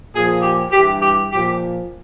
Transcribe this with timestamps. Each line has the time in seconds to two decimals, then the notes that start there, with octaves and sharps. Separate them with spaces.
0.14 A#2 F3 G#4
0.42 G4
0.72 G2 G4
0.76 E3
1.02 G4
1.32 A#2 F3 G4